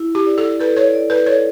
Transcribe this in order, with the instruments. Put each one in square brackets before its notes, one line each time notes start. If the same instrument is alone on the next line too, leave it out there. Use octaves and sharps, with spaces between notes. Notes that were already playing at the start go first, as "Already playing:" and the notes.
Already playing: [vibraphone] E4
[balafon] G4
[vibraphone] D5
[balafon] A4
[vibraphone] A4 [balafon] B4
[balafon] C#5
[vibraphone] D5
[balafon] B4
[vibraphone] A4 [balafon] C#5